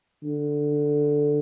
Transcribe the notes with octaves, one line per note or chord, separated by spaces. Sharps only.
D3